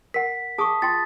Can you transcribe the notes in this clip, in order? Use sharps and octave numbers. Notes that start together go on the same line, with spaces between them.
A#4 F#5 B6
G#4 A5 C#6 D#6
F4 G5 C6 A6